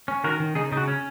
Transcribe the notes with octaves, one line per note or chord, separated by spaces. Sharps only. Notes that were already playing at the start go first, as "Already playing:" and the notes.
C#4
D#3 F#4 A#4
D#3
C#3 D#4 G#4
C#3 D#4
F#4
C#4